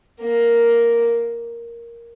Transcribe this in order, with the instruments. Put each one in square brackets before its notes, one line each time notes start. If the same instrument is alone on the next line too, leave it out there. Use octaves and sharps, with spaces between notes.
[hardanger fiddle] A#3